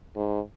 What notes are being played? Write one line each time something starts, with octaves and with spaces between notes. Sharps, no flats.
G#2